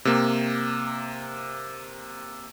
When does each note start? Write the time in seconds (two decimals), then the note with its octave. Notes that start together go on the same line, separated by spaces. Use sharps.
0.05 C3 A#3